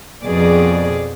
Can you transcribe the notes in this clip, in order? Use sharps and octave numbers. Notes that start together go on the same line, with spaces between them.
F2 B2 G#4 D5